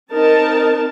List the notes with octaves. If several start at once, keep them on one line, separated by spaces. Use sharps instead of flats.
C4 D#4 A#4 A5